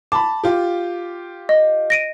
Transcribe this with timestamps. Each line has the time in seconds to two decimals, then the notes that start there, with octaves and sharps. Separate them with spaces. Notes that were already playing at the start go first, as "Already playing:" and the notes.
0.12 A5 B5 D6
0.43 F4 G4
1.49 D#5
1.90 A#6 D7 D#7